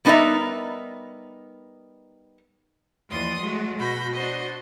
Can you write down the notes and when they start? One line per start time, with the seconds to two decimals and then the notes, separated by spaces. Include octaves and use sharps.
0.05 G3 B3 D#4 A#4 D5 E5
3.10 D#2 E3 F3 D5 C6 D#6
3.40 F#3 G#3 A3 F#4
3.77 B2 F#4 B5 G6 A#6
4.14 D4 F#4 C5 D#5